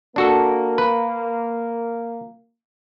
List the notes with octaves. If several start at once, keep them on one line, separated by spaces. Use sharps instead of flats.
A#3 D4 F#4 A4
B4